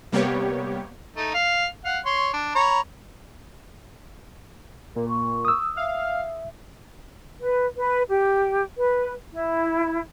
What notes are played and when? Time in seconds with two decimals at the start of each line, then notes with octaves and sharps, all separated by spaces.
0.12 C3 G3 A#3 B3 G4 C#5
1.16 A3 D#4
1.34 F5
1.85 F5 F#5
2.06 C#5 C6
2.34 D4
2.55 C#5 A#5 B5
4.96 A#2 A#4
5.09 C#6
5.45 D#6 E6
5.77 E5 F5
7.40 B4
7.78 B4
8.09 G4
8.77 B4
9.32 E4